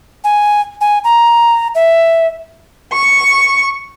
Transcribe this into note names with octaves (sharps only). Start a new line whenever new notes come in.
G#5
G#5
A#5
E5
C#6